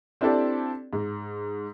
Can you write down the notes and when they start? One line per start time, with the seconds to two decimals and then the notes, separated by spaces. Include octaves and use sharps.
0.21 C4 D4 E4 G4 A4 D5
0.93 G#2